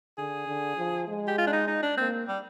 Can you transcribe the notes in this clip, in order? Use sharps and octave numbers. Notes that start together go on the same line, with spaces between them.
D3 G#4
D3
F3
G#3
G4
F4
D4
D#4
D#4
D4
A#3 C4
G3